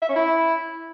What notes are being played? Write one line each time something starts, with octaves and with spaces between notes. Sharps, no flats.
E5
C#4
E4